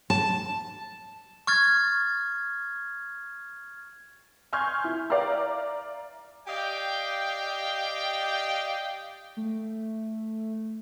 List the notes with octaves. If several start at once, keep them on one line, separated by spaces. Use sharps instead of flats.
A5
C#6 F6 G#6 A6
G#5 C6 C#6 F6 G6 G#6
E4
D5 E5 F5 A#5 F6
G4 D5 D#5 F5 G5
A3